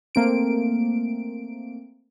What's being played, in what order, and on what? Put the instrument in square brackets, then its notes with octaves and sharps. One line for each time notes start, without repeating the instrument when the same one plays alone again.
[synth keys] A3 A#3 C4 D7